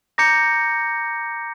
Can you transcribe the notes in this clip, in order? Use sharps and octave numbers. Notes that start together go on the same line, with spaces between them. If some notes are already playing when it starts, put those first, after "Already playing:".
A#5 D6 G6 A#6 C#7